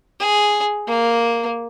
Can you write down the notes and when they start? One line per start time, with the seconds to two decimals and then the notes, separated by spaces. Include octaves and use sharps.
0.20 G#4
0.88 A#3